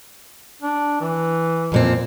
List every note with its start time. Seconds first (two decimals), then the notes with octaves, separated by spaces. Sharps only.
0.62 D4
1.01 E3
1.72 F2 A#2 C4